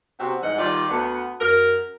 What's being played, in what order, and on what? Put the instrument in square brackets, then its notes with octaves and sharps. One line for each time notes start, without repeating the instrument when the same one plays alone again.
[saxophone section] C3 B3 C4 F#4
G#2 E3 G3 D#5 F#5
D#3 G3 F4 D5
D2 B3
F#2 A#4